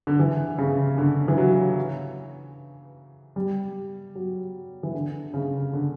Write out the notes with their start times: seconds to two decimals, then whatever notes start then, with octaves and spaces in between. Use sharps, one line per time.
0.07 D3
0.19 E3
0.58 C#3
0.98 D3
1.28 E3
1.38 F#3
3.36 G3
4.15 F#3
4.83 E3
4.94 D3
5.34 C#3
5.73 D3